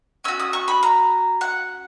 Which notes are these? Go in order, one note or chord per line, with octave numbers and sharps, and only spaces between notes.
C#4 F#4 E6
D#6
C#6
B5
A#5
F#5